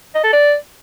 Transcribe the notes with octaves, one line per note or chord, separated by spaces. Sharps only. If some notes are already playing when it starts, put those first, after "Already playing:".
D#5
A4
D5